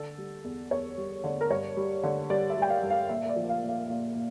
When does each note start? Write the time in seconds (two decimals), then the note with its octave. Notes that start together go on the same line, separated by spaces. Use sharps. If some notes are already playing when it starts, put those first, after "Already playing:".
Already playing: D3 A4
0.18 G3
0.44 E2
0.71 E2 C#5
0.97 G3
1.24 D3
1.41 A#4
1.50 G2 C#5
1.77 G3
2.03 D3
2.30 G3 D5
2.50 E5
2.57 G3
2.62 G5
2.70 F5
2.83 G2
2.90 F5
3.09 A#2 E5
3.23 E5
3.29 D5
3.36 F3
3.49 F5
3.63 A#2
3.69 F5
3.89 A#2 F5
4.15 A#2